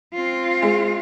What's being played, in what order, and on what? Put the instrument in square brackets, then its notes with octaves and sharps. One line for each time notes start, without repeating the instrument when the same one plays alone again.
[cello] C4 F4
[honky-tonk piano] G#3